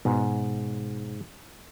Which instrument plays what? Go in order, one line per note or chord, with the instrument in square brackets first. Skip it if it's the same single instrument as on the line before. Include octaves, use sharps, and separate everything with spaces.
[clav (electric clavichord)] G#2 [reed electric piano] B2